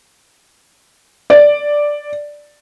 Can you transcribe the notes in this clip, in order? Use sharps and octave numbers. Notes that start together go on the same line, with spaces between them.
D5